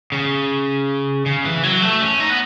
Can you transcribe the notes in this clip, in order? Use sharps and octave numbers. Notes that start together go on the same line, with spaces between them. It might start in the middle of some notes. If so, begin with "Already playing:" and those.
C#3
C#3
E3
F#3
A3
C#4
D#4
B3